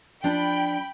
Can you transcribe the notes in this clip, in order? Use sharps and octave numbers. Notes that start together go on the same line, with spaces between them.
F3 D4 G5 B5